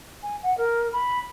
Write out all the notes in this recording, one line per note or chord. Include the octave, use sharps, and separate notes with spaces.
G#5
F#5
A#4
B5